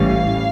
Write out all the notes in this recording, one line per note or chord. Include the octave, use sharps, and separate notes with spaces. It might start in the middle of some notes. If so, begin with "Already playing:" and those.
Already playing: A1 A2 E3 G3 C#4 F5